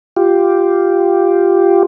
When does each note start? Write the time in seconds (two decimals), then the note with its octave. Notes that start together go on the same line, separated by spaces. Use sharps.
0.17 F4 G4